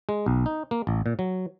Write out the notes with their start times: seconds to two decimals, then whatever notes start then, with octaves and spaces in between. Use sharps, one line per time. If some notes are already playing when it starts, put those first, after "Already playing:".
0.09 G#3
0.26 B1
0.46 D#4
0.71 A#3
0.87 A1
1.06 A#2
1.19 F#3